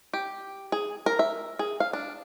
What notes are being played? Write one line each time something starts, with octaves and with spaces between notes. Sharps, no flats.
G4
G#4
A#4
E5
G#4
F5
D4